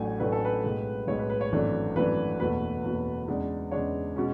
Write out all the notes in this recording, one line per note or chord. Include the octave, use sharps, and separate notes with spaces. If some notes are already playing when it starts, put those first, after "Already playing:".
Already playing: A1 A2 F#3 A3 D4 G#5
A1 A2 F#3 A3 D4 B4
A4
B4
B1 A2 G#3
B1 A2 G#3 C#5
B4
B4
C#5
G#1 F#2 E3 A3 D4
G#1 F#2 E3 A3 D4 B4
F#1 E2 B2 A3 B4
F#1 E2 B2 A3
E2 C#3 G#3 D4
E2 C#3 G#3 D4 C#5
B2 G#3 C#4